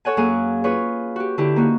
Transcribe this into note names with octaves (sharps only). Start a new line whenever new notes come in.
A4 C#5 F#5 G#5
F#2 A#3 G#4 F5 G#5 F#6
F4 G#4 B4 C#5
F#4 G4
D3 E4 G4
A#3 C#4 D#4 F#4